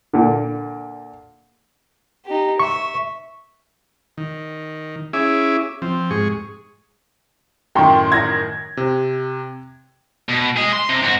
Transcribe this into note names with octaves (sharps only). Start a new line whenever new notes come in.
A#2 D3
D#4 G4
E5 C#6
D#3
C#4 E4 G#4 E5 D6
F3 C4
G#2 G#4 C#6
F#2 A2 D#3 G5 C6 C#6
G#6 A#6
C3
B2
G#4 D#5
C6
C3
G#2 F#4